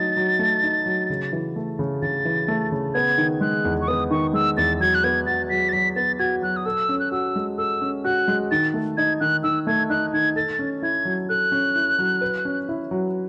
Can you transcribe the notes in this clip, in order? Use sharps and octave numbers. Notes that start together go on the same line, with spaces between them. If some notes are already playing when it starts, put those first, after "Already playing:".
Already playing: F#3 A3 D#4 A6
F#3
A3
D#4
F#3
C#3
E3
A3
C#3
C#3 A6
E3
A3
C#3
B3 G#6
D#3
G#3 F#6
E2
C#6
B3 D#6
D#3 C#6
G#3 E6
E2 A6
F#3 G#6
F#6
B3 G#6
F#4 A6
F#3 B6
A6
F#3 B6
B3 A6
F#4 G#6
F#3 F#6
D#6
A4 E6
C#4
F#6
F#4 E6
G#3
A4 E6
C#4
F#4 F#6
G#3
D#3 A6
A3
D#4 G#6
D#3 F#6
D#3 E6
A3 G#6
D#4 F#6
D#3 G#6
A4 A6
C#4
E4 G#6
F#3
A4 F#6
C#4
E4
F#3
B4
C#4
E4
F#3